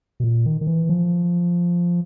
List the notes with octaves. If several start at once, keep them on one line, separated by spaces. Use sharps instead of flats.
B2
A#2
D#3
D#3
E3
F3